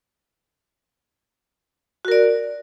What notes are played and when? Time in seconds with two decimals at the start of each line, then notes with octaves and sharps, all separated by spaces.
2.05 F#4
2.08 A#4
2.12 D5